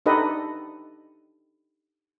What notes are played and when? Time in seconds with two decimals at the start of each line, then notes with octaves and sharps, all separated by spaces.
0.06 D4 D#4 G4 A4 B4 D#5